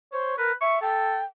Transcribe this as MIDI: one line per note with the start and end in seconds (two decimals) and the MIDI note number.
0.13 0.35 72
0.13 0.33 73
0.38 0.52 70
0.38 0.52 71
0.61 0.82 76
0.61 0.77 85
0.82 1.20 69
0.82 1.25 79